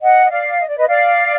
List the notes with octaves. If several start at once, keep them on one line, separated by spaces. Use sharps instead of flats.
D#5 F#5
D#5
D5 F5
D#5
D5
B4 D#5
D5 F5